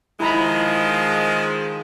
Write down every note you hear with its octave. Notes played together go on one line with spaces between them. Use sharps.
D#3 F3 G#3 E4 A#5 B5